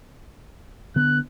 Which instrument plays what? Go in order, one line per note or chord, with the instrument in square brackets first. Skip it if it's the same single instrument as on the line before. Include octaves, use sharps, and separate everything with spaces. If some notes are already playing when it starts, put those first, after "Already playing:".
[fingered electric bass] D3 B3 [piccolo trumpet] F#6